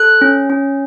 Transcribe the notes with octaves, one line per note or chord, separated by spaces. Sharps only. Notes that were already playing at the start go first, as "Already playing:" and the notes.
Already playing: A4 F#6
C#4
C#4